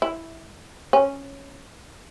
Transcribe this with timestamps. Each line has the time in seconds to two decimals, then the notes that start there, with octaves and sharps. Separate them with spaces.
0.02 E4
0.93 C#4